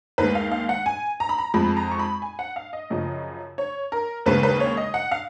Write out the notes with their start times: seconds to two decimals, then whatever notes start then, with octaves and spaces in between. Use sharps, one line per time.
0.18 D#2 D#3 G#3 B4
0.35 F5
0.51 F5
0.69 F#5
0.86 G#5
1.20 A#5
1.29 B5
1.38 A#5
1.54 F2 F3 G#3 B5
1.77 A#5
1.91 C#6
1.99 B5
2.22 G#5
2.39 F#5
2.56 F5
2.73 D#5
2.90 F#2 C#3 F3
3.58 C#5
3.92 A#4
4.26 D#2 C#3 G#3 B4
4.43 B4
4.60 C#5
4.77 D#5
4.94 F#5
5.11 F5